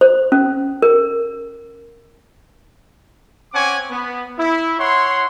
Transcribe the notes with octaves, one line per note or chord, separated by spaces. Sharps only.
C5
C#4
A#4
C4 C#4 C#5 F#5 G#5 D6
B3
E4
E4 C#5 F#5 C6